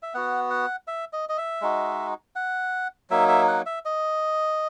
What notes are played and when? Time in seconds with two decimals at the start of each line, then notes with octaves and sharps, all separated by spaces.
0.03 E5
0.14 B3 F#4 F#5
0.50 F#5
0.88 E5
1.13 D#5
1.29 D#5
1.38 E5
1.61 G#3 D#4 F#4
2.36 F#5
3.10 F#3 A#3 D#4 E5
3.28 E5
3.48 F#5
3.66 E5
3.85 D#5